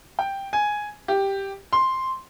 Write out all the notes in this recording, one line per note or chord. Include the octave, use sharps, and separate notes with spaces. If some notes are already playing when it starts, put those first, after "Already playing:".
G5
G#5
G4
C6